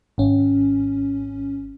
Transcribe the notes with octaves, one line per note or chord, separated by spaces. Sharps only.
G#1 C#4